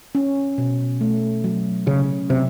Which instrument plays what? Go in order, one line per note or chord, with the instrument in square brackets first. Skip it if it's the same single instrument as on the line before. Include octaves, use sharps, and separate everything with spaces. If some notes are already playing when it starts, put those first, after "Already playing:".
[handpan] C#4
B2
A3
F#3
[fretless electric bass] C#3 [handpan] C#4
[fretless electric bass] C3 [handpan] F#3